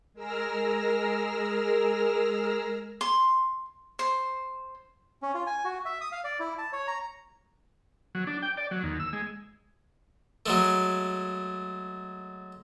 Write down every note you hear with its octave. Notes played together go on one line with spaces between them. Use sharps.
G#3 G#4 A#4 E6 F6 A#6
C6
C5
C#4
F4
G#5
F#4
E5
D#6
F5
D5
E4
A5
C#5
A#5
F#3
D4
G5
D5
F#3
D#2
E6
G#3
F#3 G#3 A3